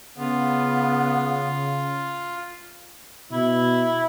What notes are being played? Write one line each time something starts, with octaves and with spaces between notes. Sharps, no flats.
C#3 B3 F4
B2 E4